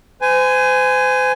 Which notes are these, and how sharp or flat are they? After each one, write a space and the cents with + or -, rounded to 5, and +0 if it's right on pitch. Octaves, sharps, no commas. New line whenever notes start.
C5 -40 G#5 +0